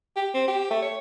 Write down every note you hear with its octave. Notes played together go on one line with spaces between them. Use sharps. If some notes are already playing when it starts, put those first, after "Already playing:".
G4
C4
G4
A3
C#5